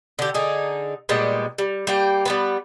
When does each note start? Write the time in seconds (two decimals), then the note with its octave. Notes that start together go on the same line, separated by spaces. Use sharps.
0.19 D3 G4
0.34 D3 D#4 G#4
1.09 A#2 G3 G#3 B3
1.58 G3
1.87 G3 A#3 G5
2.25 G3 B3 B4